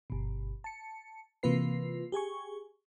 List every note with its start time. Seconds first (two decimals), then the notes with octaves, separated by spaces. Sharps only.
0.10 G1 B2
0.64 A5 C#7
1.43 C3 E3 A#3 F4 B4 C7
2.12 G4 G#4 G#5 C#6